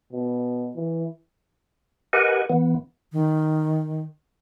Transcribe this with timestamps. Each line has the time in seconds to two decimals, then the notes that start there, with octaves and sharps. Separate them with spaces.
0.13 B2
0.76 E3
2.13 G4 A#4 B4 D#5 F#5 G#5
2.50 E3 B3
3.13 D#3